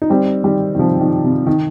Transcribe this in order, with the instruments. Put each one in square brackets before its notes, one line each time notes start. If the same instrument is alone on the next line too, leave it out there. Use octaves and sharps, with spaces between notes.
[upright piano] D#4
G3 C4
D#3 G3
D#3
C3 F3
D#3
C3
D#3